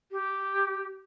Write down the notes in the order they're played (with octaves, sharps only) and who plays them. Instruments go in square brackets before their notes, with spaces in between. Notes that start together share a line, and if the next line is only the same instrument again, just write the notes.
[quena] G4